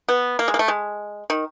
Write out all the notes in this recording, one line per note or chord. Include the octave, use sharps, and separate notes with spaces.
B3
A#3
G#3
A#3
A3
G#3
D#3